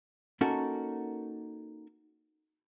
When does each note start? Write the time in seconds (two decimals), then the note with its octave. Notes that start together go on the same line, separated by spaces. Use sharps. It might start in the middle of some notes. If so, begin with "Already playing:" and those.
0.41 A#3 C#4 D#4 F#4 A4 A#4